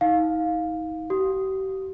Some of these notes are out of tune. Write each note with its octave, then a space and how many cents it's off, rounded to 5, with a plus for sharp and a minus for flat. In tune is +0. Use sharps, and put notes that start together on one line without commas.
D#4 +35 F5 +10
G4 -40 D#6 +0